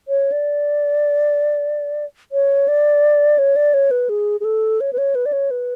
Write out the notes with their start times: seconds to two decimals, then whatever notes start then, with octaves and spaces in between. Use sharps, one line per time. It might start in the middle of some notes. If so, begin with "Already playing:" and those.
0.08 C#5
0.32 D5
2.32 C#5
2.68 D5
3.38 C#5
3.56 D5
3.74 C#5
3.91 B4
4.09 G#4
4.41 G#4
4.44 A4
4.81 C#5
4.93 B4
4.98 C#5
5.15 B4
5.26 D5
5.33 C#5
5.51 B4